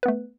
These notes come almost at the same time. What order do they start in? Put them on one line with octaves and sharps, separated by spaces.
B4 B3 A3